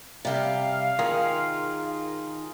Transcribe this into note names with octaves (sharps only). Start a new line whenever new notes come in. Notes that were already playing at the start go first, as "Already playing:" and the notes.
C3 G3 F5
D#3 F4 G#4 A#4